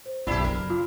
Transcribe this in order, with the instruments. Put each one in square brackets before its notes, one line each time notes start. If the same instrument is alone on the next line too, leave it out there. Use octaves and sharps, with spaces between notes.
[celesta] C5
[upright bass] B1 F#2 [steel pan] D4 [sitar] E4 G4 [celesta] B5 C7 E7
[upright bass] F#2 C#3 [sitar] A#4
[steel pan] F4